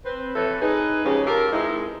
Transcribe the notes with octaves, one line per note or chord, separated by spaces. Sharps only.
C4 B4 C5
F2 A2 E3 A4 B4 C#5
D#4 G#4 B4
G#2 C#3 F3 C#4 G4 G#4
F4 G4 A4 A#4
E3 G#3 C4 D#4 E4